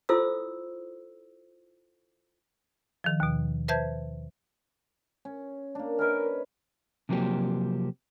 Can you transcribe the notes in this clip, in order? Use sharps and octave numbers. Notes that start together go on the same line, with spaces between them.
E4 F4 A4 C5 D#6 E6
D#3 F3
D#2 B2
B4 C5 E5 A5 G6 G#6
C#4
A#3 D4
C#4 D#4 A#4 B4
C3 F3 F#3 A#3 C4 G4